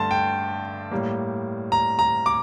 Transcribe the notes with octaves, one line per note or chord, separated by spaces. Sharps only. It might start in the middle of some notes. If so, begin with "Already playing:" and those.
Already playing: G2 D3 A3 A5 C6
G5
A2 G3 A#3
A#5
A#5
D6